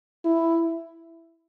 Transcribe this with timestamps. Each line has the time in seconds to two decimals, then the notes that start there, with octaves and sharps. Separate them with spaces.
0.25 E4